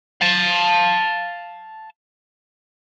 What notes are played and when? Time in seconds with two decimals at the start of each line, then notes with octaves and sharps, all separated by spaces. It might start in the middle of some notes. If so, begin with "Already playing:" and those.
0.21 F5 A5